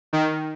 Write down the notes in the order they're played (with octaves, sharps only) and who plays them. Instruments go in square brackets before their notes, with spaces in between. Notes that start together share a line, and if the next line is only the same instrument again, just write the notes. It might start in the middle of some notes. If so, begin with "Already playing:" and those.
[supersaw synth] D#3